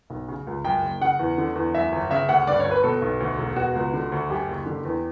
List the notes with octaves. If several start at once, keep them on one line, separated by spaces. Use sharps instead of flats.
B1
C#3
C#2
F#2 G5
F#1
C#3 F#5
E2
D3
E2
F#2 E5
G1
C#3 E5
D2 F#5
G2 D5
C#5
G1
B4
B2 A4
B1
D2
E1
B2 F#4
C#2
D3
D2
F#2 G4
F#1
D3
E2